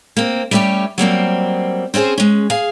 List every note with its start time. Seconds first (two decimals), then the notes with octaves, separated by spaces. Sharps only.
0.17 A#3 C4
0.51 G3 A3 C#4 F#4 G4
0.98 F#3 G3 A#3 C4
1.94 C4 C#4 F4 G#4 C5
2.18 G#3 C#4
2.50 G#4 F5